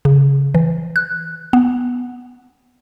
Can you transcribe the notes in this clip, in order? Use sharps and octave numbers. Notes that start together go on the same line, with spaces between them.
C#3
E3
F#6
B3